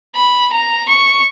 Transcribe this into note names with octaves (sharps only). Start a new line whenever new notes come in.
B5
A#5
C#6